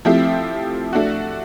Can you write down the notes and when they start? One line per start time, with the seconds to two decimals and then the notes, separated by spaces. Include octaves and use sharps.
0.05 F3 A3 C4 E4 G4
0.93 A3 D4 F#4